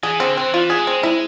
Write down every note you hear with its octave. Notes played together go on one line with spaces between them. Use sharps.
E3 G#4
D3 C4
E3 C4
E3 F4
G#4
G#3
C4
G#3 E4